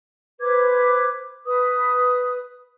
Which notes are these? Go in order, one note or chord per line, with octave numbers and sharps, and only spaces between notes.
B4 C5 D6 G#6
B4 D#6